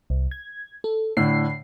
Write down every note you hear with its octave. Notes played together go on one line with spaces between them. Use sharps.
C2
G#6
A4
A2 D3 B5 C7